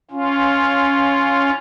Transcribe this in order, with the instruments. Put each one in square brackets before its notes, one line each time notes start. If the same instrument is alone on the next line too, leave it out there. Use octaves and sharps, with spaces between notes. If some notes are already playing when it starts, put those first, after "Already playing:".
[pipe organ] C#4 F4